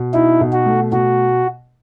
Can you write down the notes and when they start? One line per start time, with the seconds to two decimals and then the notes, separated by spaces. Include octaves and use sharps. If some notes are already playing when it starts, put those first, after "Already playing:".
Already playing: B2
0.14 D#4 E4
0.41 B2
0.53 F#4
0.66 A3
0.92 B2 F#4